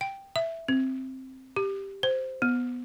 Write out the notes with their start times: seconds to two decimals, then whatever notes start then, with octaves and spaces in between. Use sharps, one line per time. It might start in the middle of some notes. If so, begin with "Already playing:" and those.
0.01 G5
0.36 E5
0.68 C4
1.56 G4
2.03 C5
2.42 B3